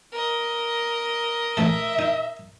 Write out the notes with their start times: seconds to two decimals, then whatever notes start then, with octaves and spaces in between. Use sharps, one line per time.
0.13 A#4 D#5
1.57 A1 A3 A4 E5
1.99 D#4